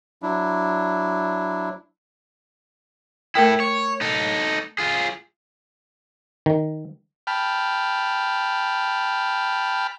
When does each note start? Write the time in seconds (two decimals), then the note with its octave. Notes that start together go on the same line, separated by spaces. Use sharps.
0.22 F#3 D4 E4
3.35 A3 E4 A4 A#4 G5
3.60 C#5
4.01 D#4 A4
4.78 F4 G#4
6.46 D#3
7.27 G5 A5 B5 F6